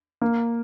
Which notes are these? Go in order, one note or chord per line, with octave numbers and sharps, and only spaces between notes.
A#3